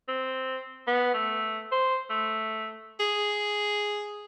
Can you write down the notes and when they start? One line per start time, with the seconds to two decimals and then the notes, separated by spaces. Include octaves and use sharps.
0.08 C4
0.87 B3
1.14 A3
1.72 C5
2.10 A3
3.00 G#4